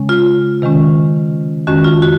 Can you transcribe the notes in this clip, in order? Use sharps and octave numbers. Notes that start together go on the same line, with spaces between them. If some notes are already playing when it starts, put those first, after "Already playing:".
Already playing: C#3 G#3 C#4
F4
C3 D#3 G#3 C#4
F2 D#3 G#3 C#4 F#4
F4
F#4